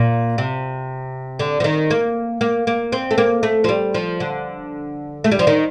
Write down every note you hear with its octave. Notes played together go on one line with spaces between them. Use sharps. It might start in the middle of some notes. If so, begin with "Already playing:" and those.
Already playing: A#2
C3
D3
F3
D#3
A#3
A#3
A#3
C4
A3
A#3
A3
F3
G3
F3
D3
A3
G3
F3
D#3